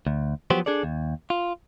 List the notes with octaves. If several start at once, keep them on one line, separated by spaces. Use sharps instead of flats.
D2
F3 F#3 B3 F#4 G4 C5
D4 G#4 A4 D5
D#2
F4